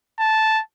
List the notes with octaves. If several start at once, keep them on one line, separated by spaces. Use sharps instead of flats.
A5